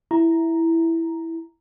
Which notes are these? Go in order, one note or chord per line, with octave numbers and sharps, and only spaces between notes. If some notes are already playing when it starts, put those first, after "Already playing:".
E4 A#5